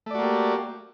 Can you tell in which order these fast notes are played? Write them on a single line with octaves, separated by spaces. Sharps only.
A3 D5 F#4 A#3 G4